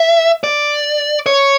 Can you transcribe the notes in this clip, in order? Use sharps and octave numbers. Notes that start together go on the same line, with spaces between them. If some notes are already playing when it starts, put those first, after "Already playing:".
Already playing: E5
D5
C#5